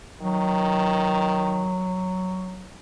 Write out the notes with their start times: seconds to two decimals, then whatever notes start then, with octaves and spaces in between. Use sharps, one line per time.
0.21 D#3 F#3